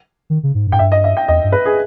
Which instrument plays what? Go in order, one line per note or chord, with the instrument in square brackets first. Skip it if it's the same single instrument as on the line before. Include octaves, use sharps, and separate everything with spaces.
[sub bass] D#3
C#3
G#2
G2
[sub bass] G#2 [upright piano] G5
[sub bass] G2 [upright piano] E5
[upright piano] D#5
E5
G5
[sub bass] E2 [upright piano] D#5
[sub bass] G2
[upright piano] B4
G#4